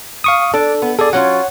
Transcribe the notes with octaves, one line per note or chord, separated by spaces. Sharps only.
F5 C#6 D#6
D4 A4
B3
G#4 A4 D5
F#3 C#4 F4 C#5 F#5